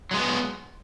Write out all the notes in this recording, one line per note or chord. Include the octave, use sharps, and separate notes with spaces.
F#3 G#3 B3